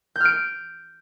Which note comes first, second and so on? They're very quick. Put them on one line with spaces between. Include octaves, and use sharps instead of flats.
G6 F6 D7